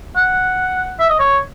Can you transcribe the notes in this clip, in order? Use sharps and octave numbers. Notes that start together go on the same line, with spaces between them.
F#5
E5
D#5
C#5